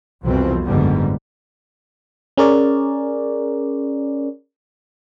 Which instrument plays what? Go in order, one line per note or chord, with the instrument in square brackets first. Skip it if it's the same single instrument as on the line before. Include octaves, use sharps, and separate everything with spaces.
[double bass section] C2 F2 B2 E3 F3 C4
F#1 G#2 B2 D3 G3
[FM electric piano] C#4 G#4 A#4 C#5 D5